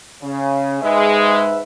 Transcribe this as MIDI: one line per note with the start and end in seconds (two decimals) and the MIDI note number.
0.22 0.81 49
0.82 1.62 44
0.82 1.50 56
0.82 1.62 71
0.82 1.62 76